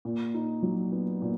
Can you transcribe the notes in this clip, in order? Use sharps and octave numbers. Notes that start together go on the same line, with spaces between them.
A#2
D#4
F#3
B3
A#2